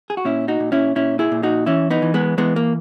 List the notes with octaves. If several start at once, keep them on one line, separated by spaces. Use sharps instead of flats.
G#4
F#4
A#2 C#4 E4
D#4 F#4
A#2
C#4 E4
A#2 C#4 E4
E4 G#4
A#2
D#4 F#4
E3 C#4 E4
B3 D#4
E3
G#3 B3
E3 G#3 B3
A#3